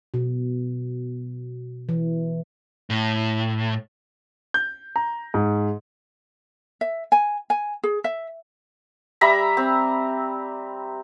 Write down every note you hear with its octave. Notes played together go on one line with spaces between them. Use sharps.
B2
E3
A2
G6
A#5
G#2
E5
G#5
G#5
G#4
E5
G3 E5 A#5 B5
C4